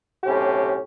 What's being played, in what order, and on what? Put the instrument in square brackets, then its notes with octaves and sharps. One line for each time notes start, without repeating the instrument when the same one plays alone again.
[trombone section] B1 A2 C3 C#4 G4